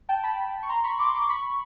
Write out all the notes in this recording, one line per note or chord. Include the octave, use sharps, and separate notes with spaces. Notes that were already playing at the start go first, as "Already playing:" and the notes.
G5 A5
A5 B5
C#6
A#5 C6
B5 C#6
C6 D6
C6 D6
B5 C#6